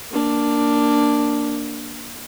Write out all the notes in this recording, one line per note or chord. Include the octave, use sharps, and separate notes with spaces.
A#3 D4